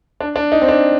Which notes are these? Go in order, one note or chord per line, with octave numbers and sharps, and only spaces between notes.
D4
D4
D#4
C4
D4